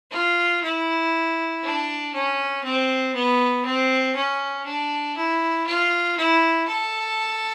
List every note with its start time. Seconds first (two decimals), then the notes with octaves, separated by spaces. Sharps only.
0.11 F4
0.63 E4
1.63 D4
2.14 C#4
2.64 C4
3.14 B3
3.65 C4
4.15 C#4
4.65 D4
5.17 E4
5.67 F4
6.17 E4
6.68 A4